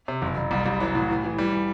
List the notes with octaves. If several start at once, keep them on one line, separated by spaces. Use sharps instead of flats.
C3
F#1
F#1
C2 G3
C2
E3 F#3
A2
E3
E3
E3 G3
E3